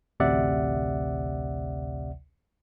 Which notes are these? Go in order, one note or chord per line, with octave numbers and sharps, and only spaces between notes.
A1 D2 C3 D5 E5 F#5